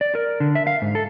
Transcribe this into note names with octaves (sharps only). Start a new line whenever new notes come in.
D5
A#4
D3
E5
F5
G#2
A4